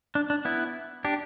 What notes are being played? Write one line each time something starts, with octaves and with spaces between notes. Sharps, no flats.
D4
D4
B3 E4
D4 G4